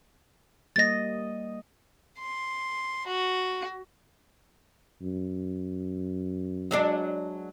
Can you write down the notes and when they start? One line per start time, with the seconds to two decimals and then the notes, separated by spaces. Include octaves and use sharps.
0.76 G3 A#3 D#5 A6 A#6
2.19 C6
3.07 F#4
5.01 F#2
6.71 F#3 G#3 D4